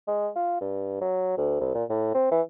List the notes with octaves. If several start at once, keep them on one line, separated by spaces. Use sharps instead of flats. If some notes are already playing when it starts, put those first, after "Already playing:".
G#3
F4
G2
F#3
D2
C2
A#2
A2
C4
E3